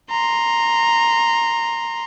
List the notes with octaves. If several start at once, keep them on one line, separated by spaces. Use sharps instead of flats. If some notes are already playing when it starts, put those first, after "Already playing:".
A#5 C6